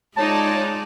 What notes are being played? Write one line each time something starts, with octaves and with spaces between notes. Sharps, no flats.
G#3 D#4 F4 C#5 D5 A5